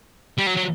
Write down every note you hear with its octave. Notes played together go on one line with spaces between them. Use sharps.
G3
F#3
F#3